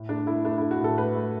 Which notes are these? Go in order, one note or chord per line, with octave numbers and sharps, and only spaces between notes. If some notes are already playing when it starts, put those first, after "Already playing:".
Already playing: A2
A3 D4
A3 E4
A3 D4
E4
A3
F#4
A2 A4
A3 B4
A3